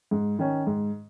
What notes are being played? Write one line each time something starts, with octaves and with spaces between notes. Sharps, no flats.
G#2
D#3 C#4
G#2